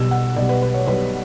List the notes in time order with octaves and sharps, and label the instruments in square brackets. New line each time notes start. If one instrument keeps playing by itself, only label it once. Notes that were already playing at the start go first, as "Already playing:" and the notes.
Already playing: [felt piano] B1 B2 G3 E6
F#5
B1 B2 G3 D5
B4
B4
C#5
B1 B2 G3 B4